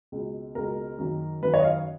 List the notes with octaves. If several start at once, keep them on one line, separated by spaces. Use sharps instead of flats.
C#2 B2
C#2 B2 A#4
F#2 D#3
F#2 D#3 B4
C#5
D#5
F5